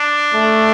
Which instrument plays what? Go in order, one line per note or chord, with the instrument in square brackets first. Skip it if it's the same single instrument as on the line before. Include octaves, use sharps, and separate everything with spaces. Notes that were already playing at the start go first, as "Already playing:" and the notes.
Already playing: [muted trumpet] D4
[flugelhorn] A3